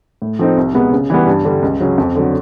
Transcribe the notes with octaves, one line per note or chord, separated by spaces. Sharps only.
A2
F3 A3 C4 D#4
C2
B2 G#3 B3
C#3
E3 G3 B3
G2
D3 G3
C#2
C#3 F#3
F2
D3 F#3